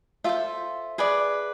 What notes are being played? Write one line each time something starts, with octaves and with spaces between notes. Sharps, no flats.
F4 A4 C5 E5
G#4 B4 D5